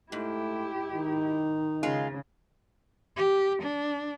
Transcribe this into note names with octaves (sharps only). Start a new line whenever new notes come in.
G#2 A3 E4 G4
D#3 D#4
C#3 G#3 F4
G4
D4